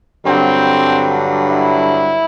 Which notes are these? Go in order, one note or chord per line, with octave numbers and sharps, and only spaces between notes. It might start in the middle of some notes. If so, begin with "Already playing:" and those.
G2 D3 F#3 C4
E4